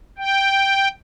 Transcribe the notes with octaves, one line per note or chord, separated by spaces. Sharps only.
G5